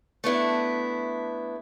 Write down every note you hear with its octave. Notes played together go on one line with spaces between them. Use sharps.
A3 B3 D4 E4